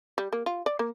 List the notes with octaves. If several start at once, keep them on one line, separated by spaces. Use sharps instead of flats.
G3
A#3
F4
D5
A#3